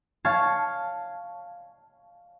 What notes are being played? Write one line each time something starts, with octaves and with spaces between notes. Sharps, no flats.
C#5 F5 A5 C#6 G#6 C7